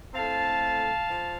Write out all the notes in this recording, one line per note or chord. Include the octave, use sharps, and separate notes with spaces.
A2 A3 C4 F5 A5
F3